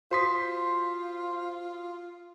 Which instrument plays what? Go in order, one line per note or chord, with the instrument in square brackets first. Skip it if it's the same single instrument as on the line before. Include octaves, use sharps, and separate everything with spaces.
[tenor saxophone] F4 [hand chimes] F#4 D#6 [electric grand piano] C5 C6 B6